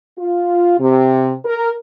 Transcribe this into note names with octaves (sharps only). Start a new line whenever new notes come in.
F4
C3
A#4